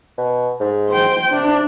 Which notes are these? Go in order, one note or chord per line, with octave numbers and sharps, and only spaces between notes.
B2
G#2
C5 G5
C3 D4